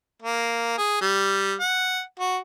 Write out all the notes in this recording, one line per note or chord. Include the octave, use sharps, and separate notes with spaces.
A#3
G#4
G3
F#5
F#4